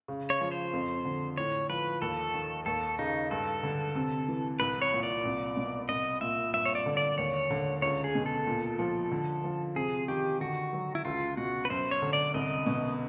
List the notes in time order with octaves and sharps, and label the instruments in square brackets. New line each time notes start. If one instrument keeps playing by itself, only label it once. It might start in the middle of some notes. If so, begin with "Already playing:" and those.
[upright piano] C#3
[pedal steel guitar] C#5
[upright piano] F3
[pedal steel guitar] C5
[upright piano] F2
D3
[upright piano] A2 [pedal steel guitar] C#5
[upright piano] F3 [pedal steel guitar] B4
[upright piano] D#2 [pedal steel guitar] A4
[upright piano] D#3
[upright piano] D#2 [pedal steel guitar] A4
[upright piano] C#3 [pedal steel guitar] D#4
[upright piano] G2 [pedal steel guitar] A4
[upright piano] D3
C3
E3
[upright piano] C2 [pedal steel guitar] B4
[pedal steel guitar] C#5
[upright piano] A#2
[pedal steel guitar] D5
[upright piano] C2
B2
[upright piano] C2 [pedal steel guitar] D#5
[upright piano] A#2 [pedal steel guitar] E5
[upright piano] G2 [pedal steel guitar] E5
[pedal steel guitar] C#5
D5
[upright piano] D3
[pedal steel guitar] D5
[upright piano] D#2 [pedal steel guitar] C#5
[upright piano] D3
[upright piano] C#2 [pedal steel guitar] C#5
[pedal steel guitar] G#4
[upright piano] B2
[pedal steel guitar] A4
[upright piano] A#2
F3
D3
F3
[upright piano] C3 [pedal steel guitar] G#4
[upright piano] D#3 [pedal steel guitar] G4
[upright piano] D3 [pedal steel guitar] F#4
[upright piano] F#3
[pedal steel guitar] E4
[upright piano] C#2 [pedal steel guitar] F4
[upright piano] B2 [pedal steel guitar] F#4
[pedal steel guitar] B4
[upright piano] F#2 [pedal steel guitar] C5
[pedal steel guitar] C#5
[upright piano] D3
[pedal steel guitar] D5
[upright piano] C2 [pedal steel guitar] D#5
[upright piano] B2